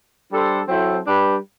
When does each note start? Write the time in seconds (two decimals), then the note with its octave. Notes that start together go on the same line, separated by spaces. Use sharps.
0.31 G3 D4 A4 C5
0.68 F#3 C4 E4 A4 C5
1.05 G3 D4 G4 B4